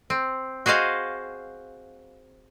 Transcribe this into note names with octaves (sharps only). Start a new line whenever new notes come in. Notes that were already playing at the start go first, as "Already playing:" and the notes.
C4
F#4 G#4 C5 D#5 F5